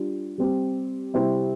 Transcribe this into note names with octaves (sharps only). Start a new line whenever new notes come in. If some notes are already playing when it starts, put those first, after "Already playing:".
Already playing: G3 D4 F4
G3 C4 G4
C3 G3 C4 E4 G4